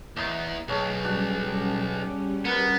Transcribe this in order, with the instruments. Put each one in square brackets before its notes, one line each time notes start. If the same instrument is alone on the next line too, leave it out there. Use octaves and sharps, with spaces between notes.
[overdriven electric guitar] E2 [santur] D#5 A#5 D#6
[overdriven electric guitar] B1 [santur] G#4 C#5 A5
[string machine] G3 C#4 [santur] D4 F#4
[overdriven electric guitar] B3 [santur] A#4 B4